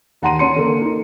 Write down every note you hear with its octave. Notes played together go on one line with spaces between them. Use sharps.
D#2 F#5 A5 A#5 C6 D#7
C#4 C6 C#7
D3 A#3
D#4